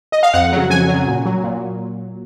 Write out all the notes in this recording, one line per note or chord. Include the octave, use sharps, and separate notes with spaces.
D#5
F5
F2 F#5
C#3 F#3
F2 G#5
C#3 F#3
A#2
F#3
A#2